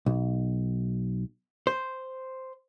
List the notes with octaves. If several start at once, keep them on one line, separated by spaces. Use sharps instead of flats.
B1
C5